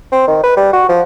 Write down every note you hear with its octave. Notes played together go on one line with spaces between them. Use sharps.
C4
D#3
B4
G3
F#4
F3